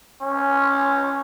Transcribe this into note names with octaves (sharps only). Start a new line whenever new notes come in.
C#4